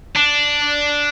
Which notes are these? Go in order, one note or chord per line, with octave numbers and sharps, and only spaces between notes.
D4